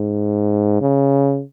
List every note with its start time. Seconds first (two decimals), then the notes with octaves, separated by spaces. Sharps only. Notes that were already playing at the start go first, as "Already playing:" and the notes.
Already playing: G#2
0.81 C#3